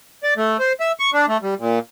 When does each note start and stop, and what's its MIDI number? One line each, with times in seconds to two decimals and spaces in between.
0.23 0.34 74
0.37 0.57 57
0.59 0.73 72
0.80 0.92 76
1.00 1.11 85
1.14 1.26 62
1.28 1.38 57
1.43 1.54 55
1.59 1.79 46